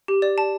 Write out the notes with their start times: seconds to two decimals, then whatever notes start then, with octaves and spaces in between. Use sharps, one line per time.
0.08 G4
0.22 D5
0.38 A5